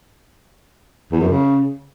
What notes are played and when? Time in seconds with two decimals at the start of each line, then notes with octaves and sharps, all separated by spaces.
1.12 E2
1.20 F#2
1.29 C#3